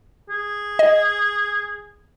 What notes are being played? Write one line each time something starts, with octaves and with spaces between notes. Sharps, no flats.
G#4
D#5